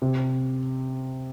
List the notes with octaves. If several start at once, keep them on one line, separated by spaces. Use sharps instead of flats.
C3